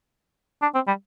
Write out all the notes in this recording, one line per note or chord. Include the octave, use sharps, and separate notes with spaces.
D4
C4
G3